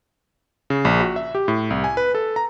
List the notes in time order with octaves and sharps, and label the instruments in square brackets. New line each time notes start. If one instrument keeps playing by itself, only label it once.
[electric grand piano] C#3
A#1
F#4
E5
G4
A2
C2
G#5
B4
A4
A#5